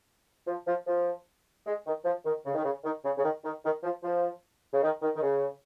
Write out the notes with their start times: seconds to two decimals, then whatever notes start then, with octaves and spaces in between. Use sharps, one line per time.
0.47 F3
0.67 F3
0.87 F3
1.66 G#3
1.86 D#3
2.05 F3
2.25 D#3
2.45 C#3
2.55 D#3
2.64 C#3
2.84 D#3
3.04 C#3
3.17 C#3
3.23 D#3
3.44 D#3
3.63 D#3
3.83 F3
4.03 F3
4.72 C#3
4.83 D#3
5.02 D#3
5.15 D#3
5.22 C#3